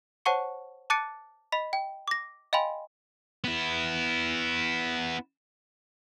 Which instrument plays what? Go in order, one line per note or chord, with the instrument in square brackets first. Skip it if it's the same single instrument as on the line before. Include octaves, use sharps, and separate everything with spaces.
[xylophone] C5 C#5 F#5 A5 C#6 C#7
A5 D6 F#6 A6 C#7 D7
D#5 B5 B6
G5
D6 A#6
D#5 F5 G5 G#5 B5 C6
[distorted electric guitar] B3 E4